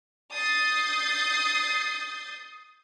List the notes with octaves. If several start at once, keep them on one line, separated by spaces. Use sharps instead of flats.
D#6 G6 A6 C7